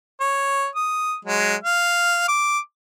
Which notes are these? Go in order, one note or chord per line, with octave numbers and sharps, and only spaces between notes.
C#5
D#6
F#3 G#3
F5
D6